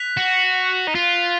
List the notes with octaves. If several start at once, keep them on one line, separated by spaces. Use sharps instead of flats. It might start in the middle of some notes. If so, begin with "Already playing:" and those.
Already playing: F#6 B6 F7
F#4
D#4
F4